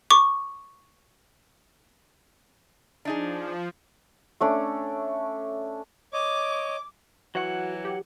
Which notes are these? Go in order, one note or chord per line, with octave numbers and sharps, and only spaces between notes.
C#6 D6
F3 D4 D#4 G#4
A3 C#4 D4
C#5 D#5 D6
E3 F#3 F#4 F#5
G4